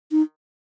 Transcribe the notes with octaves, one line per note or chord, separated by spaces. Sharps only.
D#4